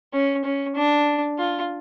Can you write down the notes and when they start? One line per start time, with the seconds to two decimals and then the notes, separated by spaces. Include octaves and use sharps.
0.13 C#4
0.45 C#4
0.76 D4
1.39 F4